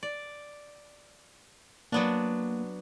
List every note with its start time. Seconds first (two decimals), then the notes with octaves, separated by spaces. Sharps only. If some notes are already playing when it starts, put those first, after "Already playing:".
0.03 D5
1.92 F#3 A#3 B3 D4